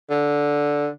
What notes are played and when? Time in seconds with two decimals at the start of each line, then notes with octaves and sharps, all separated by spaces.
0.11 D3